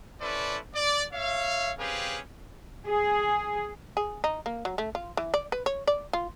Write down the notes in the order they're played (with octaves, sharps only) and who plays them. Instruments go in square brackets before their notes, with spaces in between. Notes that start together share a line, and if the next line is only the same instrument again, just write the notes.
[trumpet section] C#4 E4 A4 B4 C5 D5
D5
C#5 E5 F5
C4 C#4 G4 G#4 B4 F5
[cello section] G#4
[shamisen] G#4
D#4
A#3
F#3
A3
F4
E3
D5
B4
C#5
D5
F4